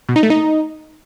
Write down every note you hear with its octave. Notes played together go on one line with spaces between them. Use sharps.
B2
D#4
A3
D#4